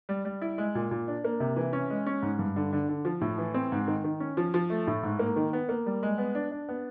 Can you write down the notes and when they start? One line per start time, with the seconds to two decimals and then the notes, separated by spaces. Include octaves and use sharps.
0.09 G3
0.25 G3
0.42 E4
0.58 G#3
0.75 A#2
0.91 A#2
1.08 D4
1.24 A#3
1.40 C3
1.56 E3
1.73 C#4
1.90 G#3
2.06 C#4
2.22 G#2
2.39 G2
2.56 D3
2.73 D3
2.89 D3
3.05 F3
3.21 A2
3.38 E3
3.54 C4
3.72 G#2
3.87 D#3
4.04 D#3
4.20 C#4
4.37 F3
4.54 F3
4.70 A3
4.87 A2
5.03 G#2
5.19 A#3
5.36 D#3
5.53 B3
5.69 A#3
5.86 G3
6.03 G#3
6.18 B3
6.35 D4
6.52 D4
6.69 B3